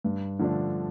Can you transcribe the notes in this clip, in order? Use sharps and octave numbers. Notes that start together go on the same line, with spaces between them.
G2
D3 F3 A3 D4